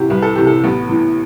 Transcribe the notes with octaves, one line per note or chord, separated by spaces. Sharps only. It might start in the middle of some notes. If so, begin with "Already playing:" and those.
Already playing: C3 E3 E4 F#4 G4
C2 B4
A4
C3 E3 G4
A4
A1 B3
A2 E3